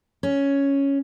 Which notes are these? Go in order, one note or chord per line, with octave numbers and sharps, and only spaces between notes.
C#4